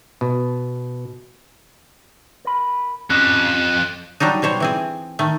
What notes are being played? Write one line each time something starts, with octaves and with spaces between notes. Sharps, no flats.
B2
A#4 B5
F2 C#4 G4 F#6
F#3 G3 D4 D#4
B2 G3 C5 C#5
E3 C4 G#4
D#3 A3